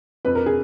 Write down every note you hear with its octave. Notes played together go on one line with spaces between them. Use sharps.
F2 B4
A#4
G#4